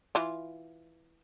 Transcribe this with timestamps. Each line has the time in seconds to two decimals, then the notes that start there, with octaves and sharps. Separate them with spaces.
0.15 E3 F4